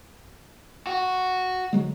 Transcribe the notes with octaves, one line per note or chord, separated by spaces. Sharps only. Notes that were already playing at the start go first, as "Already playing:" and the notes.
F#4
D3 F#3 G#3